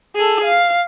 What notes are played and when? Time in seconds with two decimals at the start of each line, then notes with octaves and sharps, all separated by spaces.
0.16 G#4 A4
0.45 F5